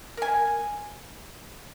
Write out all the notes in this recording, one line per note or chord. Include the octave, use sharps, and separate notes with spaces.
A#4 G#5